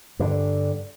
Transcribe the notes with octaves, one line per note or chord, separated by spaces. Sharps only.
G2 D3